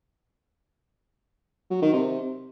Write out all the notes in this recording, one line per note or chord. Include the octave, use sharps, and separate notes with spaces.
F#3
D#3
C3